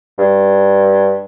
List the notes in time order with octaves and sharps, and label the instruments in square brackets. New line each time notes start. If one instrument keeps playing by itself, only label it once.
[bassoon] G2